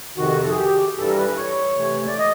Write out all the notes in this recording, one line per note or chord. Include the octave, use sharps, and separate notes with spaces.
F2 C3 D#3 F#4
A4
G#4
G4
G2 E3 G3 A4
A#4
B4
C#5
C3 E3 A3
D5
D#5